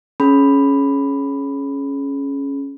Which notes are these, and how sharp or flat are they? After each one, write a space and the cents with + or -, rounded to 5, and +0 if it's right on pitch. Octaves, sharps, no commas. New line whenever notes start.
C#4 +0 G#4 +30 B5 +5